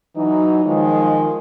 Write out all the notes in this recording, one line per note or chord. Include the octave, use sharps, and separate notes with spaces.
E3 F#3 D#4
D#3 F3 G#3